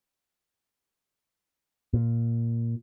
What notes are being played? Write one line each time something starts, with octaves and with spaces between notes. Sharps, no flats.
A#2